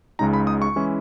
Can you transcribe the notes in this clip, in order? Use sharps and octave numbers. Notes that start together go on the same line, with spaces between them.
C#2 C#3 G#3 D#4 A#5
B5
D#6
C#6
E3 G#3 C#4 E4